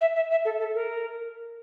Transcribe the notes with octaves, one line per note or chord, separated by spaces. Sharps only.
E5
E5
E5
A4
A4
A#4